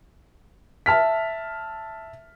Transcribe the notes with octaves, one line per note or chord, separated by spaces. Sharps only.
E5 A5 F6 B6